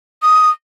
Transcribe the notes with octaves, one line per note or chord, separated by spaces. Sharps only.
D#6